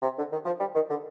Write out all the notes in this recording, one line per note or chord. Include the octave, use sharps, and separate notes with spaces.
C3
D3
D#3
F3
G3
D#3
D3